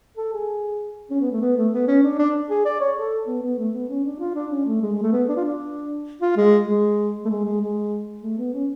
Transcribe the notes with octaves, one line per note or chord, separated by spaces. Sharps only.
A4
G#4
C#4
B3
A3
B3
A3
B3
C#4
D4
D4
G#4
D5
C#5
A4
B3
B3
A3
B3
C#4
D4
F4
D4
C#4
A3
G#3
G#3
A3
B3
D4
F4
D4
F4
G#3
G#3
A3
G#3
G#3
G#3
A3
B3
C#4